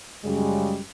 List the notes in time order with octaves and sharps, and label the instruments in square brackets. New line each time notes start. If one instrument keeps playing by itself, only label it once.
[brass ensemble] F#2 C#3 G3 G#3